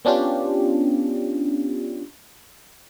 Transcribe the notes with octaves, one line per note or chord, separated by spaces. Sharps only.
B3 C#4 D4 F4 G4